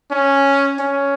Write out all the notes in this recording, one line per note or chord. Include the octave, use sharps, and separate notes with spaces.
C#4
C#4